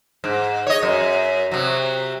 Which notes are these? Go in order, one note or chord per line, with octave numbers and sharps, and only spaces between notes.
G#2
C#5 D#5
F#2
C3 F#3